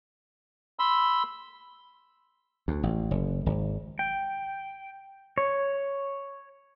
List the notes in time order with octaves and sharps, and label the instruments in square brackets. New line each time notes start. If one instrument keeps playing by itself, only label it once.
[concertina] B5 C6 E6
[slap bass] D2
A1
F#1
G#1
[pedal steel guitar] G5
C#5